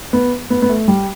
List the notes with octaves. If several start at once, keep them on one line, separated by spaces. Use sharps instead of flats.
B3
B3
B3
A3
G3